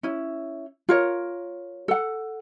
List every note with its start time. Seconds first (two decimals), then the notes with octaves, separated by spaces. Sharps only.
0.03 C#4 E4
0.89 F4 A#4 C#5
1.88 A4 F#5